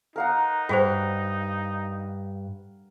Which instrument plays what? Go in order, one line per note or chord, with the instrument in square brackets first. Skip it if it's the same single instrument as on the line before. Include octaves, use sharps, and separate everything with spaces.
[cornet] D#4 [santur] A#4 F5 F#5
[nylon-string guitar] G2 [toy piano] F#4 G#4 C5